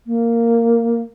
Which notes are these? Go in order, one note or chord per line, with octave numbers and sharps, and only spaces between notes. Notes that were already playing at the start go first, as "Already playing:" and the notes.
A#3